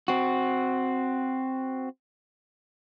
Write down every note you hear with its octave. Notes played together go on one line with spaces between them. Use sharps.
C4 F#4